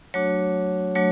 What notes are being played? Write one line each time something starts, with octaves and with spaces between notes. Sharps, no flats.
F#3 A3 D4 F#4 C#5
F#3 A3 D4 F#4 C#5